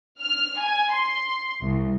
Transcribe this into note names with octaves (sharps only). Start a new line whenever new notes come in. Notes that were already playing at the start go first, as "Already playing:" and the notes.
F6
G#5
C6
C2